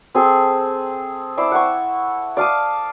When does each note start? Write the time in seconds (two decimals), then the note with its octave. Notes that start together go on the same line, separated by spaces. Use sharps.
0.15 C4 G#4 A4
1.37 E4 C5 D5 A5
1.52 F#5 C#6
2.37 D5 F5 A5 D#6